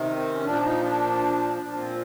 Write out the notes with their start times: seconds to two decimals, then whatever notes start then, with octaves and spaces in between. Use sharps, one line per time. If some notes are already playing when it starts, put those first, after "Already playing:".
Already playing: C3 D#3
0.16 C4
0.33 C#4
0.45 A#2 F3 D4
0.64 D#4
0.83 D4
1.58 A#2 F3 D4
1.78 C4